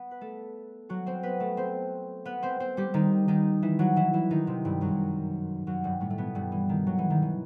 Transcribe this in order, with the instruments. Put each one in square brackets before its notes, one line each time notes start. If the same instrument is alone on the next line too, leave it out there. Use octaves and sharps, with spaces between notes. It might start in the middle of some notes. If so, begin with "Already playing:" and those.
Already playing: [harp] B3
B4
A3 A4
F#3 F#4
C4 C5
B3 B4
A3 A4
C4 C5
B3 B4
C4 C5
C4 C5
G3 G4
D#3 D#4
D#3 D#4
E3 E4
F#3 F#4
E3 E4
E3 E4
D#3 D#4
C3 C4
G2 G3
F#2 F#3
F#2 F#3
G2 G3
A2 A3
A3
B2 B3
G2 G3
E3
D#3
F#3
E3
D#3
E3